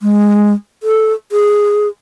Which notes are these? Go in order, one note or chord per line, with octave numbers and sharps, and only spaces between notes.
G#3
A4
G#4